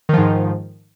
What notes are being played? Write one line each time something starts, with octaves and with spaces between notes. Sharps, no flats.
G#2 D#3 F3